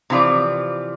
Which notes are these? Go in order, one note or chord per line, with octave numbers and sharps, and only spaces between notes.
C3 E3 F3 F4 D5